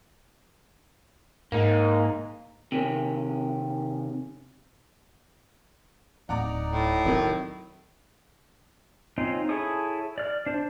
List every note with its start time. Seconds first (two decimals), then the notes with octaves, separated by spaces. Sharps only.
1.52 G#2 A#3 D#4
2.72 C3 D#3 C#4
6.29 D1 D#4 D5 F#5 A#5 D6
6.70 A2
7.05 C3 D#3 F#3 C4
9.18 C4 C#4 D#4 F4
9.49 E4 G#4 A4 C#5 D#6
10.18 D5 F6
10.46 D4 C5